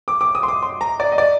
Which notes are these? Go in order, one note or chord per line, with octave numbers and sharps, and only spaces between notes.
D6
D6
D#6
C6
D6
C6
A#5
D5
D#5
D5